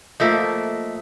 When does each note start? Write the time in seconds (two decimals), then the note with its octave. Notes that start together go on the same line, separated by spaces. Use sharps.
0.20 F3 A3 A#3 D#5 E5